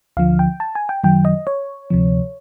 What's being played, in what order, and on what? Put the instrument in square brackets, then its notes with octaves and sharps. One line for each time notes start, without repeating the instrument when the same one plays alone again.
[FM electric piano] D2 D3 F3 F5
G5
A5
G#5
G5
F#2 D#3 F#3 G5
D#5
C#5
D2 C3 F3